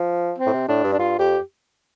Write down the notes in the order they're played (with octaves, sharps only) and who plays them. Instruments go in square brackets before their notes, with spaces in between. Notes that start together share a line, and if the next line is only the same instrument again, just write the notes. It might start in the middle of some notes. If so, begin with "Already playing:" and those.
Already playing: [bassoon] F3
[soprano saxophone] C4
[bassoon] A2
C3
[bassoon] A2 [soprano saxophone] D4
[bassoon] G2
[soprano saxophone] D4
[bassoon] G2 [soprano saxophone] F4
[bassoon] F2 [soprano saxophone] G4